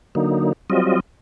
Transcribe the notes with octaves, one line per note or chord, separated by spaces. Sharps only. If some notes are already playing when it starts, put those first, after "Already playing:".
D3 F#3 A#3 D#4
F#3 G3 C4 F4 D#5